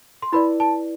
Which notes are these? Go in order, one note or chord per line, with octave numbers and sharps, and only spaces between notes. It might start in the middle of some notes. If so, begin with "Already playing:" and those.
C6
E4 B4 D5 B5
A5